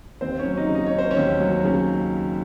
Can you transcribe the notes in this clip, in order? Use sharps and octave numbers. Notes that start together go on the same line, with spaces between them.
D#2 C4 C5
C#4 C#5
F#3
D#4 D#5
C#3
D#5
C#5
C#4
C5
C#4 C#5
D#2
F#3
C#3